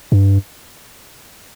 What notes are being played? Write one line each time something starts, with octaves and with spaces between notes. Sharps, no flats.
G2